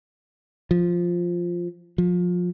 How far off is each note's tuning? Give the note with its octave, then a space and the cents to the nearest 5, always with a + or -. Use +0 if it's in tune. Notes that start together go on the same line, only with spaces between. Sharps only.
F3 +0
F3 +25